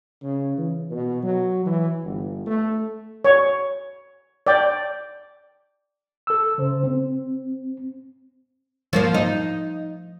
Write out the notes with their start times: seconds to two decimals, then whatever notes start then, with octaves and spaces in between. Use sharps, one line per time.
0.22 C#3
0.58 E3
0.91 B2
1.23 F#3
1.66 E3
2.03 G1
2.46 A3
3.25 C#5
4.47 D5 G5
6.27 A4 E6
6.58 C#3 C5
6.83 C4
8.93 F3 A#3 F4
9.14 D#4